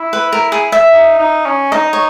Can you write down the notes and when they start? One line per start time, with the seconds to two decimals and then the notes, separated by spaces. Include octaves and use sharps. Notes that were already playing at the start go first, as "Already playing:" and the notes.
Already playing: E4
0.13 B4
0.33 A#4
0.52 G#4
0.72 E5
0.93 D#4
1.19 D#4
1.46 C#4
1.72 D#4 D#5
1.93 C#5